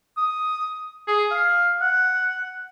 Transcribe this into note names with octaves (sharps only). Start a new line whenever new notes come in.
D#6
G#4
F5
F#5